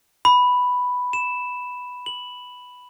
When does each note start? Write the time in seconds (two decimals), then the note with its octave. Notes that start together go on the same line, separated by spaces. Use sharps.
0.25 B5
1.13 E7
2.06 F#7